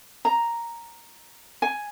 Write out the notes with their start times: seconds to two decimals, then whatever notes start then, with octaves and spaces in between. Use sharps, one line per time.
0.25 A#5
1.62 G#5